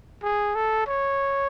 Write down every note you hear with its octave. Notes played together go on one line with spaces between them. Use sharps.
G#4
A4
C#5